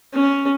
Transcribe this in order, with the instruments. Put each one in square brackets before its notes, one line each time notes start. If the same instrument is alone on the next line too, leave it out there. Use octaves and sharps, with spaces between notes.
[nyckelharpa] C#4